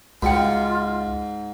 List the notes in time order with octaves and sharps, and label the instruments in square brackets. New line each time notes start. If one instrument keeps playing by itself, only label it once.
[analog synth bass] C#2 [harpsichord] G#2 [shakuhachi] F4 [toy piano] F#4 G5